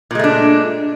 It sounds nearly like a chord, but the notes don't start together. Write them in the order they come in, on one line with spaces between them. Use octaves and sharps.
A#2 G#3 A3 D4